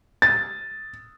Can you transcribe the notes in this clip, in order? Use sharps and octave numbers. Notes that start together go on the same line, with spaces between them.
A6